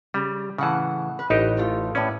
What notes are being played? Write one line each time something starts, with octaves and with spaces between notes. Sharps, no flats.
C#3 G3
A2 C#3 E3 F#5 A5
B4
A1 D#4 G4 B4 D#5
E3 A3 F4
A2 C#4 E4 B4 D5